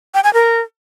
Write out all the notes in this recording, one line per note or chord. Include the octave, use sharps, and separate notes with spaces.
G5
G#5
A#4